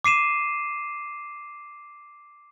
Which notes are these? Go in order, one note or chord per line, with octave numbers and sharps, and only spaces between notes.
D6 C7 D#7 E7